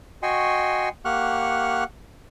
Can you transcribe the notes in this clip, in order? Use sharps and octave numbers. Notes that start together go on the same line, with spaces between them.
F#4 D#5 G5 G#5 C6 C#6
A#3 G4 F#5 C#6 F6 F#6